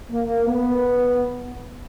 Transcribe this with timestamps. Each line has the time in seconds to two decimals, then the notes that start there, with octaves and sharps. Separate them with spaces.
0.10 A#3
0.47 B3